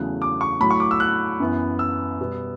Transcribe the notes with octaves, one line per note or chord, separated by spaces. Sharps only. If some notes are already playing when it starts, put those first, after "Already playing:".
Already playing: E2 C#3 F#3 A3 F#6
D6
C#6
A2 F#3 A3 B5
C#6
D6
E6
F#6
F#2 E3 B3
E6
B2 G3 B3